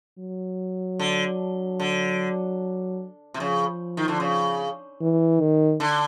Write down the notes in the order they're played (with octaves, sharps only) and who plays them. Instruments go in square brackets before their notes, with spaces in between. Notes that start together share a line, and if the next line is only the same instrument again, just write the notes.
[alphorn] F#3
[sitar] D3
D3
C3
[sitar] C#3 [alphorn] F3
[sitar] D#3
D3
C#3
[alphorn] E3
D#3
[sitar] D3